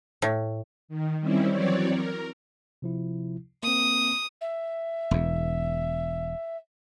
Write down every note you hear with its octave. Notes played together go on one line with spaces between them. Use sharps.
A2
D#3
D#3 G3 C4 C#4 E4
E3 F#3 C4 C#5 D5
A#4
C3 F3 E4
A#3 C4 D#6
E5
E1 E2